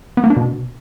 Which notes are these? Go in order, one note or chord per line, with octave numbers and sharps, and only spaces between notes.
B3
A#3
D4
B2